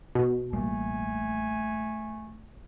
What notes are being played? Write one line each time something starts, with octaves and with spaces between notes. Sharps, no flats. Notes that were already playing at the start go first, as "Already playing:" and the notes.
B2
A1 G3 A3 A#3 G#5